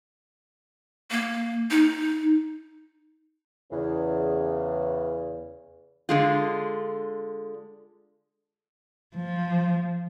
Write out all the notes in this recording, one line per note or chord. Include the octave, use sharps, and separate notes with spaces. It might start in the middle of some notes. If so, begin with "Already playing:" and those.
A#3
D#4
E2 C#3
D3 G#3 F4
F3